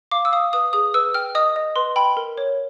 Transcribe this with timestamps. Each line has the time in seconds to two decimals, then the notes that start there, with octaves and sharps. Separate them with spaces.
0.11 F5 D6
0.25 E6
0.32 F5 D#6
0.53 B4 D#6
0.73 G#4 D#6
0.94 B4 E6
1.14 G5 F6
1.35 D#5 D#6
1.56 D#5
1.76 B4 C6
1.96 G5 B5
2.17 A#4
2.38 C#5